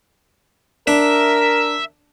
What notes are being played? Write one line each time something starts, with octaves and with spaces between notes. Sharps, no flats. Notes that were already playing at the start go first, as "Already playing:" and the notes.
D4 A#4 E5